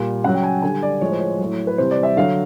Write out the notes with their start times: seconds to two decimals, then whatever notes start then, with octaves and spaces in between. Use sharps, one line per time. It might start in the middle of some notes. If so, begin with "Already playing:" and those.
Already playing: A#2 G3
0.24 C#3 F#3 F#5
0.35 G5
0.43 G#5
0.62 D3 G3 G#5
0.82 D5
1.01 A2 F3 G#3 C#5
1.11 C5
1.21 C#5
1.39 A2 F#3
1.67 B4
1.78 C3 E3 G3 C5
1.91 D5
2.03 E5
2.17 D3 F#3 F5